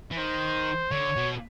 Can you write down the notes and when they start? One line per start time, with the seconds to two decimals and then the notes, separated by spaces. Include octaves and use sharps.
0.11 E3
0.18 D#3 C5
0.91 D3 C#5
1.16 B2